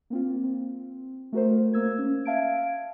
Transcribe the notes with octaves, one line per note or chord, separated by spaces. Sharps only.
A#3 C4 F4
C4
A3 F#4 A#4 C5
A#3 E6 G#6
C#4
E5 F5 A5 G#6 D7